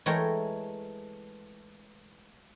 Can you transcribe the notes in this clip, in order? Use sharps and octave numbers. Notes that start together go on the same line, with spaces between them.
E3 G#3 A3 A#4 C#5 G5